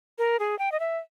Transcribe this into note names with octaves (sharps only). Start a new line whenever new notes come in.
A#4
G#4
G5
D#5
E5